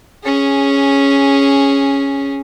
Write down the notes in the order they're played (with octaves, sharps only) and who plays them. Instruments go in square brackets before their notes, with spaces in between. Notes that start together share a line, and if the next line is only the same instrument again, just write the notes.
[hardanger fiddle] C#4 G#4